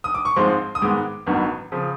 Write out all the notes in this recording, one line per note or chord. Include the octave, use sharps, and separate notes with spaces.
D#6
D6
C#6
G#2 F3 G#3 C4 C6
D#6
G#2 D#3 G#3 B3 D6
A1 G2 D#3 F#3 B3
C#3 F3